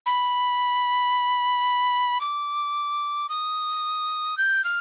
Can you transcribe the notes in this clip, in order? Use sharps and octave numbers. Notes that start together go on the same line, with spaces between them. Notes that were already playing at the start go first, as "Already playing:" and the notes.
B5
D6
D#6
G6
F6